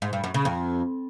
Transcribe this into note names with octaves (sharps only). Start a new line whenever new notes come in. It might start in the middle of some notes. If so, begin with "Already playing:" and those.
G#2
G2
F#2
C#3
F2